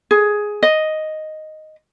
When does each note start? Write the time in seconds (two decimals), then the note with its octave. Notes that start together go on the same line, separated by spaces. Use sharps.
0.11 G#4
0.63 D#5